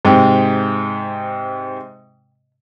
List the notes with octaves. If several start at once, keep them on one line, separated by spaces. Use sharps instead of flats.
G#2 C3 G5